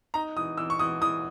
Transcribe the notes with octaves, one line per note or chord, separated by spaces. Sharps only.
D#4 A#5
E3 D#6
E3 E6
C#6
E3 D#6
E3 D#6